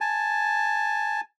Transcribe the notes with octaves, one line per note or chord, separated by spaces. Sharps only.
G#5 A5